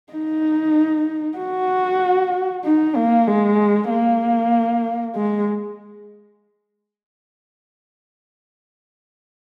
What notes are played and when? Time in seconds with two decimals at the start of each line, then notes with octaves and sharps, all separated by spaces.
0.13 D#4
1.38 F#4
2.64 D#4
2.96 A#3
3.27 G#3
3.90 A#3
5.16 G#3